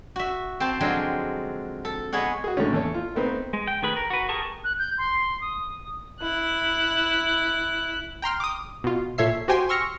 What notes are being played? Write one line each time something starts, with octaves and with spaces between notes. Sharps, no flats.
F#4 E5
C4 C5 A5
D3 F3 F#3 G#3 C4
A4
G#3 B3 G#4 C#5 F#5
F#4 G#4
A2 D3 C#4
E2 A4 C#5
F4
A3 B3 C4 D#4
G#3
G5
D#3 A3 G#4 B4 B5
A#4
F#4 B4
G4 G#4 A#4 A5 C#6
F#6
G6
C6
D#6
E4 F#6
G5 A#5 C6 F6
D6 D#6
B2 F4
A#2 A4 C#5 E5 C7
F#4 G4 C5 G5 G#5 C6
C6 C#6 E6 F6 A#6 C#7